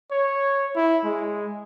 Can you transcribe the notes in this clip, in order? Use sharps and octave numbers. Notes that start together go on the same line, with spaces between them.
C#5
E4
G#3